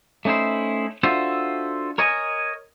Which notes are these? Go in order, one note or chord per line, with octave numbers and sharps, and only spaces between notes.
A3 C#4 D#4 E4 C5
D4 F4 F#4 A4 C5 E5
A#4 C#5 D#5 G#5